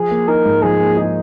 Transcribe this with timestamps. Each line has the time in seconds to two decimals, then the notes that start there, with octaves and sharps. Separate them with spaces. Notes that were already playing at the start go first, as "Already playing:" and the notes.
Already playing: F3 G#4
0.11 A#3
0.28 D#4 A#4
0.45 G#2
0.62 F3 G#4
0.80 A#3
0.97 D#4